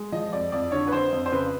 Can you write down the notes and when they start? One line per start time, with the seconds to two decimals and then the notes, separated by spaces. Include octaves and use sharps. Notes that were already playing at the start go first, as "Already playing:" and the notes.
Already playing: G#3
0.12 F3 D#5
0.32 F2 D5
0.52 F2 D5
0.72 D3 C#5
0.87 B4
0.92 F2 C5
1.12 F2
1.26 C5
1.32 C#3 B4